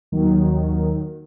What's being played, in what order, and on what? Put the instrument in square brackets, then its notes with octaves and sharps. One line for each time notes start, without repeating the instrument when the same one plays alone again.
[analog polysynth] D#2 D#3 F#3